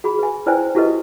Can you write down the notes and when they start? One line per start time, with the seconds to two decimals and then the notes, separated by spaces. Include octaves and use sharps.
0.04 F#4 G#4 B5
0.19 B4 G#5
0.46 E4 B4 C5 D5 G5 G#5
0.75 E4 F#4 G4 A4 B4 D#5